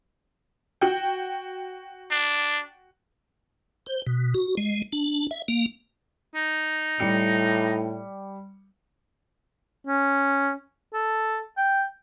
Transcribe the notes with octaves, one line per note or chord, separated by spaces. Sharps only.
F#4 G5
D4
C5
B2
F#4
G#3
D4
E5
A#3
D#4
A2 G3 C#7
C#4
A4
G5